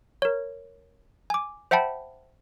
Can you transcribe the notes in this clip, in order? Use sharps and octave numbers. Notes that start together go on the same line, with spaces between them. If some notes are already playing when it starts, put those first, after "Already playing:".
A#4 C#5
G#5 D6
C5 E5 F#5 G5 A5 B5